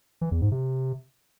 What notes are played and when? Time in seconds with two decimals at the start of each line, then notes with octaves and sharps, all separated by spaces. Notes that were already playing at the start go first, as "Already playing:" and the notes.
0.21 E3
0.31 E2
0.41 G#2
0.51 C3